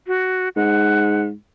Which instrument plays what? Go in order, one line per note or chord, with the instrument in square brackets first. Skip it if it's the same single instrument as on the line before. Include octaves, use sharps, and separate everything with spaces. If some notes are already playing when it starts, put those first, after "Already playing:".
[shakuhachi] F#4
[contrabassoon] G#2 [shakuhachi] F#5